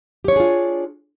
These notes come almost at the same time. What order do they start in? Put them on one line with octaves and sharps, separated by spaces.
G4 C#5 D4 G#4 F4